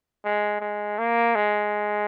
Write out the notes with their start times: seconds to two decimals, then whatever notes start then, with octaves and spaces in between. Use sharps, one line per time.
0.25 G#3
0.61 G#3
0.99 A#3
1.35 G#3